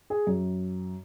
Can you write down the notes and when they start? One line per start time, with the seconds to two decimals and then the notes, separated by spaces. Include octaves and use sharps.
0.10 G#4
0.27 F#2